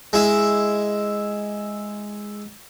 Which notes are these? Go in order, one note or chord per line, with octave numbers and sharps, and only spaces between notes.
G#3 E4